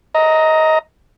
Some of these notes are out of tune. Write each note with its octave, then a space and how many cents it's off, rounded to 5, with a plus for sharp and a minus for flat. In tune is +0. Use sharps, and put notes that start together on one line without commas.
D#5 +20 A#5 +0